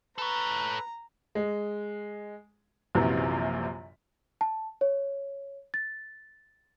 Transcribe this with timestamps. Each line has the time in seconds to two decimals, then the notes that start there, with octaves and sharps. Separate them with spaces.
0.18 A4 B4 C#5 A#5
1.35 G#3
2.95 A#1 F#2 C3 E3 F#3
4.41 A5
4.81 C#5
5.74 A6